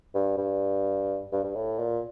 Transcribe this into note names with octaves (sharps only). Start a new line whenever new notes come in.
G2
G2
G2
G2
A2
A#2